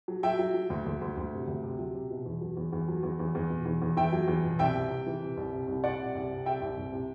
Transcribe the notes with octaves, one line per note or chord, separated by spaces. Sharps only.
F#3
F#3 E5 G5
F#3
F#3
D2
D2
D2
D2
C3
D2
C3
F#3
C3
B2
E2
F#3
E2
E2
F#3
E2
E2
E2
B2
E2
E2
E2 E5 G5
F#3
E2
B2
C2 E5 G5
C3
C3
E3
C3
C2
C3
C2
C3 D5 F#5
C3
C2
C3
C3 E5 G5
C2
C2
C3